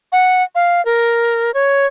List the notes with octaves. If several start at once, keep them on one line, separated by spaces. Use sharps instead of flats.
F#5
F5
A#4
C#5